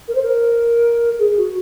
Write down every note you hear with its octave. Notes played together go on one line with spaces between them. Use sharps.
A#4
C5
A#4
G#4
F#4